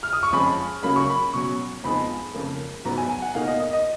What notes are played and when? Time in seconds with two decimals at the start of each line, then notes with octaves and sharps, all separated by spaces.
0.03 F6
0.13 D#6
0.23 C#6
0.33 F2 F3 G#3 C#4 B5
0.83 C#3 F#3 A#3 C#4 B5
0.96 C#6
1.09 B5
1.33 B2 F#3 C#4 C#6
1.84 F2 F3 G#3 B3 D#4 B5
2.34 F2 C#3 F3 A#3
2.85 G#2 F#3 B3 A#5
2.98 G#5
3.09 G#5
3.22 F#5
3.35 B2 A#3 D#4 F5
3.48 D#5
3.60 D#5
3.73 D#5